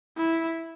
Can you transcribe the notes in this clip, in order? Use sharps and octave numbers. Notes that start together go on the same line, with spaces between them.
E4